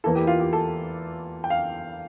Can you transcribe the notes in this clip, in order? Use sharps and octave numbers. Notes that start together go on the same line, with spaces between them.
E2 E3 A#3 E4 A4
G4
F4
G4
A4
G5
F5